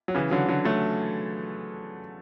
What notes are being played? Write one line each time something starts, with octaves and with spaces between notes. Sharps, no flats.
F#3
C#3 E3
D3 F#3
D3 F#3
F#3 A3